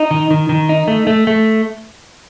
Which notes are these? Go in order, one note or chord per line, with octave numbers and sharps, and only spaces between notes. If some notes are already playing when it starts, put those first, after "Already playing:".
Already playing: D#4
D#3
D#3
D#3
D#4
A3
A3
A3